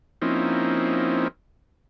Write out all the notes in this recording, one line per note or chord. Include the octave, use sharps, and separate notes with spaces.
F3 A#3 C4 C#4 D#4 E4